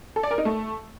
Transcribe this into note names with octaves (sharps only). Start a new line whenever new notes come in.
A4
D5
A#4
D#4
A3